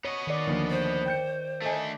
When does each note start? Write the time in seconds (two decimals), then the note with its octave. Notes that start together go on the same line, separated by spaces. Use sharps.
0.05 B3 C#5 D#5
0.27 D#3 D5
0.47 D2 F3 A#3
0.70 C5
1.06 G5 G6 C#7
1.62 A3 D4 A4 D#5 G#5